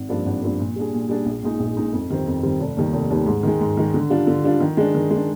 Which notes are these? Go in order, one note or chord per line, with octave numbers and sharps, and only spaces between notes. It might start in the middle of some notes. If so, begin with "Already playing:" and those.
Already playing: G#1
G2 F3 A#3 D4
G#1
G2 F3 A#3 D4
A#2
G3 D4 G#4
A#2
G3 D4 G#4
A#1
A#2 G#3 D#4
A#1
A#2 G#3 D#4
F2
D#3 G3 C4
F2
D#3 G3 C4
F1
D#2 D#3 G3
F1
D#2 D#3 G3
G#2
D#3 G#3
G#2
D#3 G#3
D3
G3 D4 F4
D3
G3 D4 F4
D#3
G#3 D4
D#3
G#3
D4